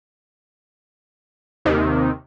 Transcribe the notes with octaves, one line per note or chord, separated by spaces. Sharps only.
D#2 C3 D#3